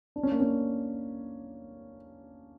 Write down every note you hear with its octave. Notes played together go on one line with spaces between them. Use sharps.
D4
C#4
A#3
C#4